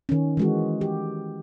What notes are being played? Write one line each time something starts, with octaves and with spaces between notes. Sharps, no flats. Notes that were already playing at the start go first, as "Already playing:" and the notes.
D#3 C#4
E3 G#3 F#4
G4